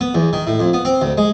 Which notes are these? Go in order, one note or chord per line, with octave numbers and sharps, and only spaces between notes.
B3
E2
D#3
A2
F2
B3
C4
D2
G#3